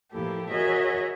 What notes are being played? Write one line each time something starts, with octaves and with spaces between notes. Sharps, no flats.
A2 F3 A#3 E4 G4 A4
F#4 G#4 A#4 C#5 D#5 E5